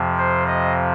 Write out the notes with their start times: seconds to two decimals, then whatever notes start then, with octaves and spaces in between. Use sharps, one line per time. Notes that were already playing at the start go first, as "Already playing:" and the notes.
Already playing: F2 C3 F3
0.18 C5
0.48 D#5